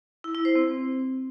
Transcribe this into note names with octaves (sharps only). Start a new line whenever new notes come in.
E4
E4
C5
C4